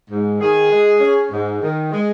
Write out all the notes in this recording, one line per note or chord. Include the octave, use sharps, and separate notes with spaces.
G#2
D#3 G#4
G#3
C#4
G#2
D#3
G#3